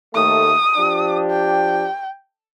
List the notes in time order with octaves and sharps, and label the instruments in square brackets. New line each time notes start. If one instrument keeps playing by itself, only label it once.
[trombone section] D#2 A3 [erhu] D#6
[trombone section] F3 D4 G4
[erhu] G5